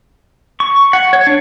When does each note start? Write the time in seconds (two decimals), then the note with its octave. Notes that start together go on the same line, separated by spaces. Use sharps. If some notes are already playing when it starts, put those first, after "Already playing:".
0.60 C#6
0.93 F#5
1.13 C#5
1.27 D4